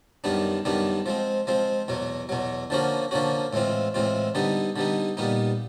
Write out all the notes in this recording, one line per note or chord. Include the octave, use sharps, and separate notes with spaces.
F#2 D#3 G3 B3 D4
F#2 D#3 G3 B3 D4
F3 G#3 C4
F3 G#3 C4
E2 B2 F#3
E2 B2 F#3
D3 F3 A#3 C#4 F#4
D3 F3 A#3 C#4 F#4
A2 E3 G#3 C4 F4
A2 E3 G#3 C4 F4
D3 G3 B3 D#4
D3 G3 B3 D#4
A#2 G3 B3 D#4